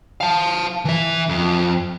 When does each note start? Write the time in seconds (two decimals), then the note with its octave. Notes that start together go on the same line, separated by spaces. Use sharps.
0.21 F5 A5
0.85 E3 E5
1.29 F2